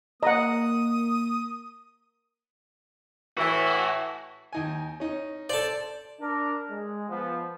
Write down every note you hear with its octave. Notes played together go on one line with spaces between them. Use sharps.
A#3 D#5 F#5 A#5 D#6
A2 E3 F#4
D#2 D#4 G#5
C#4 D#4
A4 C5 D5 A5
D4 A#4
G#3
F3 B3